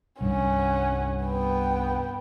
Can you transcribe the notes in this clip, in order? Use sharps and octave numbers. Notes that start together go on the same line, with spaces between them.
C2 G2 C#4 F#5
B3 G5